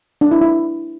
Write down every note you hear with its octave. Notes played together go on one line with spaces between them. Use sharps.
D4
E4
E4